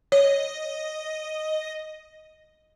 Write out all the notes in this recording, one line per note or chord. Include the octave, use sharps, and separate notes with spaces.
C#5 D#5